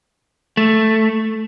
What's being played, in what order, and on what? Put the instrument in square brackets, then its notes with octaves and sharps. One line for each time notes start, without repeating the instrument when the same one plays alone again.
[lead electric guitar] A3